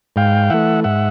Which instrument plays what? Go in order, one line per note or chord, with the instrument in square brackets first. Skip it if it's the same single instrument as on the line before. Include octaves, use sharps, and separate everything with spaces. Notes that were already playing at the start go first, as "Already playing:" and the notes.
[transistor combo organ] G#2 F5 G5
E3 A3 E5 F#5
G#2 E5 F#5